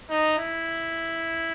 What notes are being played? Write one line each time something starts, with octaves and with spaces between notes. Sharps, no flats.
D#4
E4